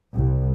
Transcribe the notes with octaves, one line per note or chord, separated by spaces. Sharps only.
C2